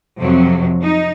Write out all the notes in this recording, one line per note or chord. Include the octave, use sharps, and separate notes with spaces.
F2 C3 F#3
D#4